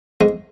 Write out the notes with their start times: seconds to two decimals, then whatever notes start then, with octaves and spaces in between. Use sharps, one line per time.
0.21 G#2 G#3